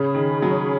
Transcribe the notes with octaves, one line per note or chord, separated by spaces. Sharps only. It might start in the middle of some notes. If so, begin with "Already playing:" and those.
Already playing: C#3 C#4 G#4 C#5 B5
D#3
F#3